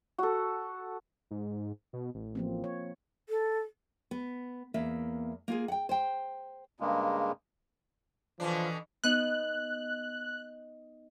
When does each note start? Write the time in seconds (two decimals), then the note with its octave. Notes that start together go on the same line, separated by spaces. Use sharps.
0.18 F#4 A4
1.31 G#2
1.93 B2
2.15 A1
2.35 F3 A#3 C4
2.64 C#5
3.29 A4
4.11 B3
4.74 E2 A#3 E5
5.48 A#3 F4 G#4
5.68 F#5 G5
5.89 C5 G5
6.80 G2 C#3 G#3 A#3
8.40 B2 D3 E3 F3 D4
9.04 B3 D#4 F#6